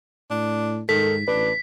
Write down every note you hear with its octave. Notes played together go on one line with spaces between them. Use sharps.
A2 D4
G#2 D#3 A4 B6
A1 D4 B4